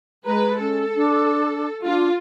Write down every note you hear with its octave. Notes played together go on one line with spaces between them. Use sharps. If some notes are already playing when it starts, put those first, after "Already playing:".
G#3 B4 A#5
C#4 A4
D4
D4 F4